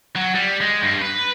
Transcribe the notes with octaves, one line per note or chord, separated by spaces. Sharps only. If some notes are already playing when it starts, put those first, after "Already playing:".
F#3
G3
G#3
G2
B4